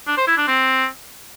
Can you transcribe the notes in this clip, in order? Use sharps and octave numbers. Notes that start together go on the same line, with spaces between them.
D4
C5
E4
D4
C4